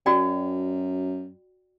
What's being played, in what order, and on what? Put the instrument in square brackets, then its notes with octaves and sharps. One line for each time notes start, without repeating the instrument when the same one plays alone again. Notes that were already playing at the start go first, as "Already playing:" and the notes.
[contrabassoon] F#2 [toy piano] F#4 D5 G5